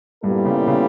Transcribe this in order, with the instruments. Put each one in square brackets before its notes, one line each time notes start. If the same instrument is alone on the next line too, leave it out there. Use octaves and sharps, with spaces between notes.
[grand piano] G2 [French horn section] A#2 G3 B3 E4 A4
[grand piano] C#3
C#3